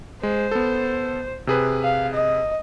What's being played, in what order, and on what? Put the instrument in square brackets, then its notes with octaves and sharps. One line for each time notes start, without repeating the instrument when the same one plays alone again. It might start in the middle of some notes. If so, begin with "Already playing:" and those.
[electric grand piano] G#3 [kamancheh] C5
[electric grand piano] B3 A4
C3 G#4 B4
[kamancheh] F5
D#5